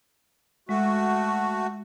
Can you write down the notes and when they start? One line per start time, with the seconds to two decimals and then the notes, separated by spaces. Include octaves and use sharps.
0.69 G#3 A3 F#4